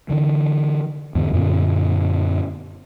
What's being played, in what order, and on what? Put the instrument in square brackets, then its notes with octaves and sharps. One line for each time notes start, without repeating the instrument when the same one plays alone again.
[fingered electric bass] D3 E3
E2 G#2 D3
F#2 A#2 D3 B3